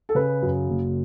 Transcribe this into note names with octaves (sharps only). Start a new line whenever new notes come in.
A4
C#3 B4
F#2
F#1